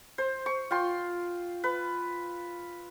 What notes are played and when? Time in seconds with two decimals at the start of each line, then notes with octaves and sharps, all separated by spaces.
0.18 C5
0.46 C#6
0.71 F4 G5 C6
1.64 B4